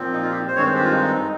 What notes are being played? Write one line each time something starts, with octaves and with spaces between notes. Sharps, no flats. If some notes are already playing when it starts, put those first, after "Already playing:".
Already playing: A#2 F3 C4
D#4
F4
G4
C5
G2 D#3 G#3 C4 C#5
C5
G4
F4
D#4